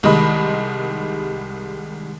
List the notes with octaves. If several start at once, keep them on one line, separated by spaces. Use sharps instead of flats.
C2 D#3 G3 G#3 D#5 B5